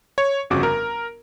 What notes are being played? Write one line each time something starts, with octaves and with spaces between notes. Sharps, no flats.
C#5
G1 F2 C#3 F#4 D6
A#4